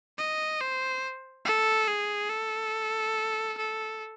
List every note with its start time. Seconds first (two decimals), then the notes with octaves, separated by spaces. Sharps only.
0.18 D#5
0.61 C5
1.45 A4
1.88 G#4
2.30 A4
3.57 A4